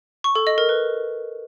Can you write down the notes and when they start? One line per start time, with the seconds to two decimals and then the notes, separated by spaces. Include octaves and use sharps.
0.24 C#6
0.35 A4
0.47 D#5
0.58 A#4
0.69 B4